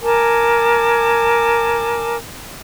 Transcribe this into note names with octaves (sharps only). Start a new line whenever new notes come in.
A#4 G#5 A5 D6